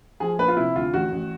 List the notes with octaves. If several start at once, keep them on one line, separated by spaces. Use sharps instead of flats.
F3 G#4
A#1 B4
F4
C3 E4
D2 F4
A1 F#4
A1